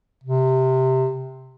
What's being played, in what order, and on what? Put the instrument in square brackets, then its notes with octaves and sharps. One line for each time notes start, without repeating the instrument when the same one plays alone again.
[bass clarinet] C3